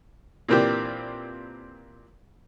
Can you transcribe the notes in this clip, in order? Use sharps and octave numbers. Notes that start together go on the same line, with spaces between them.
A#2 E3 A#3 C4 D4 G4